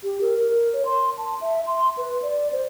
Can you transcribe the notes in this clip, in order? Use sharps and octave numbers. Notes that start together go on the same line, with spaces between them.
G4
A#4
A#4
C#5
C6
A5
E5
C6
B4
D5
C5